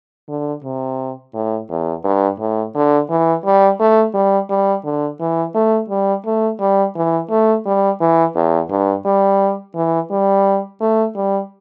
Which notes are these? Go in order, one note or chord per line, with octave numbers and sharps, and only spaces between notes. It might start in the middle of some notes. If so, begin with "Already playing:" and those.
D3
C3
A2
E2
G2
A2
D3
E3
G3
A3
G3
G3
D3
E3
A3
G3
A3
G3
E3
A3
G3
E3
E2
G2
G3
E3
G3
A3
G3